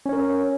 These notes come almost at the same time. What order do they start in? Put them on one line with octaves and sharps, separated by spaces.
C#4 C#5 A#4